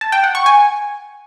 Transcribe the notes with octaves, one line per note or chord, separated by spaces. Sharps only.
A5
G5
F#5
C#6
G#5